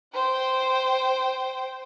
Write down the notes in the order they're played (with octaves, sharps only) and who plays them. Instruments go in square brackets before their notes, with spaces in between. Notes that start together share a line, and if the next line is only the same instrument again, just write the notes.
[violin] C5 G5